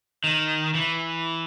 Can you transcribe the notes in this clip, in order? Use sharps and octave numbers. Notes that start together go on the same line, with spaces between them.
D#3
E3